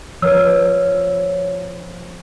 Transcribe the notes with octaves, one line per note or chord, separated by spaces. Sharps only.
F3 B4 C#5 E6